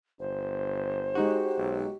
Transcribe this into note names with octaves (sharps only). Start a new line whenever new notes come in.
G1 C5
G#3 D#4 F#4 G4
B1